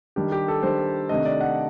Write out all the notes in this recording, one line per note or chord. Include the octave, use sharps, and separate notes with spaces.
D#3 G3 D4 G4
G4
A4
D#3 G3 D4 C5
C3 D#3 A3 D4 D#5
D5
F#5